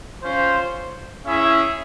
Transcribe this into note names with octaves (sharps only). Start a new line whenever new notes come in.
C#4 F4 C5
C#4 E4 G#4 E5